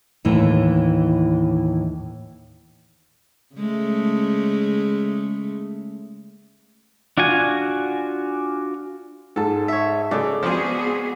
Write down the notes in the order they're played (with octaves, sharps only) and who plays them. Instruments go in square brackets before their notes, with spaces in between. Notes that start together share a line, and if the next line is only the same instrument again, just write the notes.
[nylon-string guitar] D#2 A2 E3
[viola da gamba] C#3 G#3 A3
[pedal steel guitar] D4 F4 F#4 G#5
[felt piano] G#2 G#3 A5 [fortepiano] A4
[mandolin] C#5 E5
[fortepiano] C#3 [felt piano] G#3 A4 [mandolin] D5
[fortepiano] F3 C4 [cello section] B3 F#4 G#4